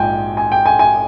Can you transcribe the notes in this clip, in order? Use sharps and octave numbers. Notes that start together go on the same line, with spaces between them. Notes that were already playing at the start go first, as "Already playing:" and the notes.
Already playing: A#1 G#2 F3 G5 G#5
G#5
G5
G#5
G#5